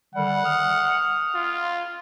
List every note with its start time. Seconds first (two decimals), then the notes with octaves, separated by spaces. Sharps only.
0.15 D3 D#3 G3 F#5
0.45 D#6 F6
1.35 F4